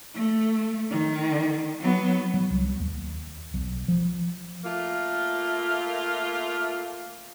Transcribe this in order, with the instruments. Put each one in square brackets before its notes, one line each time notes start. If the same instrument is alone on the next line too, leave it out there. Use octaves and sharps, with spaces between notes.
[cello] A3
D#3
F#3 B3
[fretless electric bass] F#3
C2
D#2
B1
F3
[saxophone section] A3 A#3 F4